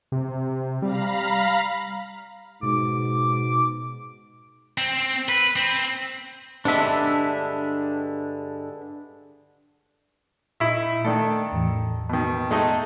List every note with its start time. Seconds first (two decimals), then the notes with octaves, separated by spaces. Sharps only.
0.12 C3
0.82 G3 F5 A#5 B5
2.63 G#2 B2 D6
4.78 C4
5.29 B4
5.56 C4
6.65 G2 D3 G#3 D4 E5
10.60 A#2 D#4 E4 E5
11.05 D#3 A3 D4 A4
11.52 E2 A2 E3
12.09 B2 D#3
12.51 G#3 A3 D#4 A4 D5